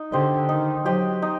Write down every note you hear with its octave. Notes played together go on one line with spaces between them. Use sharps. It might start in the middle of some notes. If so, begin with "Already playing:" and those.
Already playing: D#4
D3 G4 C5 D#5
D#3 D#4
F#3 G4 C5 D#5
D#4